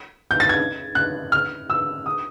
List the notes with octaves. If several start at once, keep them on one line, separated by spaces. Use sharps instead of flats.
G6
A6
G#6
F#6
F6
E6
D#6